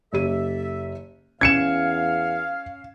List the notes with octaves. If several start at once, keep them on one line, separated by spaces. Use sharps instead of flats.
F#1 G4 A4 E5 D#7
E2 C#4 F5 G#6 C#7 E7